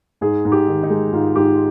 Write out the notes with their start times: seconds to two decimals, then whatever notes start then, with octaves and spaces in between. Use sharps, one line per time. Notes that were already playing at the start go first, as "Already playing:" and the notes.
0.21 G#2 G#4
0.45 G#2
0.52 G4
0.68 D#3
0.83 D#4
0.90 G#3
1.13 G#2 F4
1.36 G#2 G4